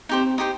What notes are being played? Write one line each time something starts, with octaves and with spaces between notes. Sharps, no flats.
C4 D#4 G4 C5
D#4 G4 C5